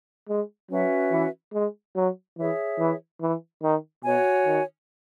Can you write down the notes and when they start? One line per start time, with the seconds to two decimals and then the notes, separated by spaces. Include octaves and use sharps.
0.28 G#3
0.70 F#3 C#4 F#4 B4 E5
1.12 E3
1.53 G#3
1.95 F#3
2.37 E3 G#4 C#5 E5
2.79 E3
3.21 E3
3.63 D#3
4.04 B2 F#4 C#5 G#5
4.46 D#3